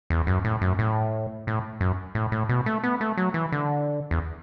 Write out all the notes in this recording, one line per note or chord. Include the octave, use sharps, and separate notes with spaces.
E2
F#2
A2
F#2
A2
A2
F#2
A2
A2
B2
A3
B3
A3
F#3
E3
D3
E2